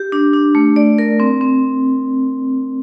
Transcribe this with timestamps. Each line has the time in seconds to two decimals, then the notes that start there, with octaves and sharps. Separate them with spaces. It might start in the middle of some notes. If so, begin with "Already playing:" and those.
Already playing: G4
0.12 D4
0.34 D4
0.55 A3
0.76 D5
0.98 A#4
1.20 C4
1.41 C4